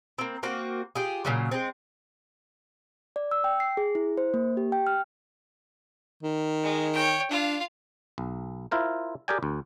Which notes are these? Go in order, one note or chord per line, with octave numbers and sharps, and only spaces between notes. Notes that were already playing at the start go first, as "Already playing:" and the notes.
A#3 C4
A#3 C4 F#4
F4 G4 G#4
A#2 C#3 F#3
G#3 C4
D5
E6
G5
C7
G#4
E4
C5
A#3
G4
G5
F6
D#3
G#3
C#5 G5
D4 F4 F5
B1
E4 F4 A#4 C5
G4 G#4 A#4 D5 G5 G#5
D2